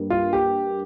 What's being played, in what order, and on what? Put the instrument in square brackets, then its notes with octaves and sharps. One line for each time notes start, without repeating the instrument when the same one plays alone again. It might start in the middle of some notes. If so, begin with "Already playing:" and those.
Already playing: [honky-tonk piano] G2 G3 A#3
[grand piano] F4
G4